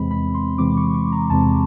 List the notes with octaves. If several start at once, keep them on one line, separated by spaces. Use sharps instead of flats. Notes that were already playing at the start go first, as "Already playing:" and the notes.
Already playing: E2 C3 E3 G#3 C4 B5
B5
C6
E2 C3 E3 G#3 C4 D6
C#6
C#6
A#5
E2 C3 E3 G#3 C4 A5